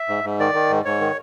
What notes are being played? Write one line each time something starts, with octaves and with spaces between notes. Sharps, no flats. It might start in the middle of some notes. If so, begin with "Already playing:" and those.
Already playing: E5
G#2
G#2
D#3 D5
D#3
G#2
G#2 C#5
D#3